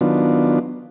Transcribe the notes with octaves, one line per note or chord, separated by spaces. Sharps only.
D#3 F#3 B3 D4 F4